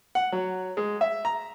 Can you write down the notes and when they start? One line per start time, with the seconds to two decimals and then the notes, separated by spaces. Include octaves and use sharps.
0.15 F#5
0.32 F#3
0.77 G#3
1.01 E5
1.25 A#5